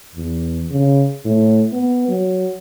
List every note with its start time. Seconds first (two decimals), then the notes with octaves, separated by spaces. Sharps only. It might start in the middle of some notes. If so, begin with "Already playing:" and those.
0.15 E2
0.71 C#3
1.25 A2
1.73 B3
2.08 F#3